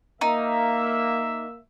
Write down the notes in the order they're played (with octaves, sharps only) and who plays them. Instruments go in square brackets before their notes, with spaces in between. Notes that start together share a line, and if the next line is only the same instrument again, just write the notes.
[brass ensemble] A#3 E5 [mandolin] D#4